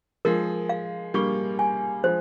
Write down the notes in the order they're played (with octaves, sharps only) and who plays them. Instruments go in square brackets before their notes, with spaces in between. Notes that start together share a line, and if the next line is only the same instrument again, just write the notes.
[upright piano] F3 G#3 [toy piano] A#4
[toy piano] F5
[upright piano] G3 A#3 [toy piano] C#6
[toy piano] G#5
[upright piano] F3 G#3 [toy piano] C5